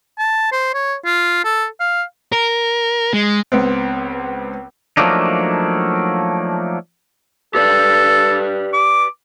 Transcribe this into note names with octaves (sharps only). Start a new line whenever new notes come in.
A5
C5
C#5
F4
A4
F5
A#4
G#3
C#2 B3 C4
F3 F#3 A3 A#3 D4 D#4
G4 A4 B4 D5
D6